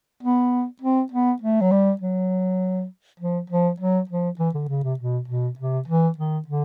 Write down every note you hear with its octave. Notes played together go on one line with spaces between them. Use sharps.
B3
C4
B3
A3
F#3
G3
F#3
F3
F3
F#3
F3
E3
D3
C#3
C3
B2
B2
C3
E3
D#3
D3